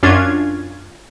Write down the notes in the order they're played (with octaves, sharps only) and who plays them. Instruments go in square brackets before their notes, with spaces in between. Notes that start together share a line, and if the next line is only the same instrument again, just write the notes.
[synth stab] F#2 C#4 D4 F4 G#6